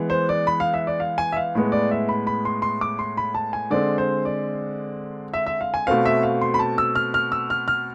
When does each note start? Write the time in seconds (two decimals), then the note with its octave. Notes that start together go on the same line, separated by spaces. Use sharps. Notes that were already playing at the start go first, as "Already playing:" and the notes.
Already playing: E3 G#3 B3
0.10 C5
0.29 D5
0.47 B5
0.60 F5
0.74 E5
0.87 D5
1.00 F5
1.18 G#5
1.32 E5
1.37 F5
1.55 A2 G#3 B3
1.72 D5
1.91 E5
2.09 B5
2.27 B5
2.45 C6
2.62 C6
2.81 D6
2.99 C6
3.17 B5
3.34 A5
3.53 G#5
3.70 D3 G#3 C4 D5
3.98 C5
4.25 D5
5.34 E5
5.46 E5
5.61 F5
5.74 G#5
5.87 B2 A3 C4 F5
6.06 E5
6.23 F5
6.41 C6
6.54 B5
6.59 A5
6.78 E6
6.95 F6
7.14 F6
7.32 E6
7.50 F6
7.68 F6